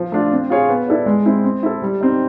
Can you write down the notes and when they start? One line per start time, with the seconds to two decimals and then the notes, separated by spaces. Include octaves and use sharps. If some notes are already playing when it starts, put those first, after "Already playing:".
Already playing: F3
0.12 A3 D4 F4
0.32 C4
0.50 F4 G#4 C#5 F5
0.69 B3
0.88 E4 A4 D5
1.06 G#3
1.26 C4 E4
1.44 C4
1.63 E4 A4
1.82 G3
2.01 C4 D#4